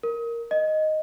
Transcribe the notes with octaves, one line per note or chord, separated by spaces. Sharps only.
A#4
D#5